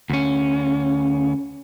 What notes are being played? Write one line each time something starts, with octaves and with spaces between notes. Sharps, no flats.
D2 C#4